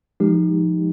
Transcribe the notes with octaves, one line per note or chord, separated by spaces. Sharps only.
F3 G#3 D#4 G4